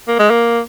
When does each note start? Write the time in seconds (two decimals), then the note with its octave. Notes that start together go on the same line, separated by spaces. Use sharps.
0.08 A#3
0.19 G#3
0.30 A#3